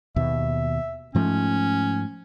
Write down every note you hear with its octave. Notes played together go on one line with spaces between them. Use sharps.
D#2 B2 E5
G#2 F3 A3 C#4